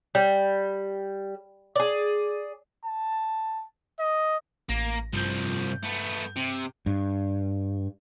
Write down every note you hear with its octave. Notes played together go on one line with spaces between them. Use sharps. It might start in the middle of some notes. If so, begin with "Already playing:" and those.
G3
G#4 D5
A5
D#5
A1 A#3 A#6
C2 G2 F3 G6
A3 B3
C3
G2